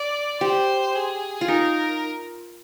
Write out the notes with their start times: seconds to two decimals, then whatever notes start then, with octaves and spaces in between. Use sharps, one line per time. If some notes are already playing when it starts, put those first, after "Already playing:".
Already playing: D5
0.41 G4 C5
0.95 G#4
1.41 F4
1.48 D#4 A#4